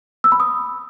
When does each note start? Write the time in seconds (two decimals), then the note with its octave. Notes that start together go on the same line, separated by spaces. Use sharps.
0.24 E6
0.32 B5
0.40 D#6